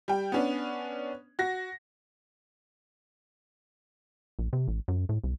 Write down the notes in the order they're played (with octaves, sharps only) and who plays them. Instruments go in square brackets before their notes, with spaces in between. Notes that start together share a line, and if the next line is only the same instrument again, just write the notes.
[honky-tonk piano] G3 G5
B3 C#4 D4
F#4 A#6
[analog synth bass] A#1
C3
A1
F#2
A2
C2